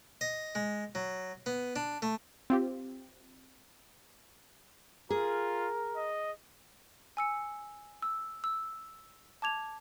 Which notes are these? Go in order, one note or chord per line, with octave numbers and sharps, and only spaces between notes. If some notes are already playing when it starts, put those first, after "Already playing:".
D#5
G#3
F#3
B3
D4
A3
C4 F4 G4
F4 G#4 A#4
D#5
G#5 E6 C#7
E6
E6
A5 D6 G#6 F7